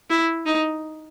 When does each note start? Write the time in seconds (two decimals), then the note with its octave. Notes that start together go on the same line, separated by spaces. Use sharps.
0.10 E4
0.46 D#4